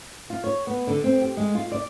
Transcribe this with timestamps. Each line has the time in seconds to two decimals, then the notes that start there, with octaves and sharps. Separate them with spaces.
0.30 F4
0.44 C#5
0.67 B3
0.87 D3
1.04 C4
1.21 G4
1.37 G#3
1.55 F4
1.72 D5